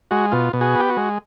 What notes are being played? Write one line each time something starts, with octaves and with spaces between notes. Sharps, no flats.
G#3 F#4
B2 F4
B2
F#4 G#4
B3 G4
F#4
G#3